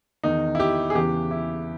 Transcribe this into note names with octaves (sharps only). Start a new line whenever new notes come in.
E2 D#3 D#4
E4
G4
G#4
E2 C#3 E3 G4
E4